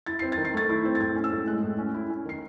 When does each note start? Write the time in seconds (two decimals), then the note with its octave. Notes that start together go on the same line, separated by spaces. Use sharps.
0.06 E4 A6
0.19 C4 C7
0.32 A6
0.38 D#3
0.45 C7
0.54 A3 A6
0.69 E4
0.85 C4
0.95 A6
1.00 A2 G#6
1.16 C#4
1.24 E6
1.32 A2
1.47 G#3 F#6
1.63 A2
1.78 C#4
1.94 E4
2.10 C#4
2.25 D#3 C7